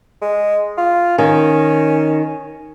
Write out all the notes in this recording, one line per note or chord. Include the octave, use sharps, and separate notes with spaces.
G#3
F4
D#3 C#4